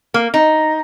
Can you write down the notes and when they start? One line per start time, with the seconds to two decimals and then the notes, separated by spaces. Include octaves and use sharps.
0.14 A#3
0.34 D#4